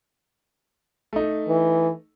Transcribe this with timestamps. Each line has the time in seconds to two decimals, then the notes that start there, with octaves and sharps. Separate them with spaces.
1.13 A3 D#4
1.48 E3